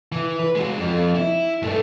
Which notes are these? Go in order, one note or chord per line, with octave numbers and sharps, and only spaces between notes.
E3
B4
G#3 F#4
F2
E4
G2 A3